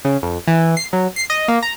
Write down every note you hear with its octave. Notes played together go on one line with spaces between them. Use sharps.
C#3
F2
E3
C7
F#3
C7
D#5
A#3
A#5